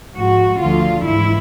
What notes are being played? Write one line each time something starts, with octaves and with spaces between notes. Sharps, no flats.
G#2 F3 F#4
D2 D3 F3 F4
G#2 E3 E4